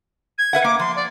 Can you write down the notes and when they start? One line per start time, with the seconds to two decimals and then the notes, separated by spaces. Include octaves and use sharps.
0.38 G#6
0.53 B4 E5 F#5
0.64 A#3 D6
0.79 F3 C6
0.96 D5